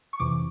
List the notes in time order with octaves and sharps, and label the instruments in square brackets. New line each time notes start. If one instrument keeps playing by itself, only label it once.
[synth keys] C#6
F2 C3 E3 D6